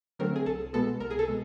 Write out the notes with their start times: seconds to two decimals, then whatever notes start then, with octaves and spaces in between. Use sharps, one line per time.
0.19 D3 F#3 A3 C4 A#4
0.36 G#4
0.46 C2 A4
0.73 B2 G#3 B3 A4
1.00 C2 A#4
1.11 G#4
1.19 A4
1.28 B2 G#3